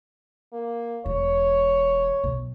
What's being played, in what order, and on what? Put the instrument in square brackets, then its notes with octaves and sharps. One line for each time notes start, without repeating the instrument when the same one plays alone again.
[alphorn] A#3
[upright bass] E1 [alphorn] C#5
[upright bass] B1